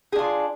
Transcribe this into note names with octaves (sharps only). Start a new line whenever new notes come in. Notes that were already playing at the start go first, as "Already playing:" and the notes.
D4 F4 G#4